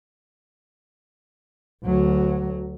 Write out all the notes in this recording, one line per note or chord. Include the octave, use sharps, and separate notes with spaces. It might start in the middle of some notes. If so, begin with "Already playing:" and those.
D2 F#3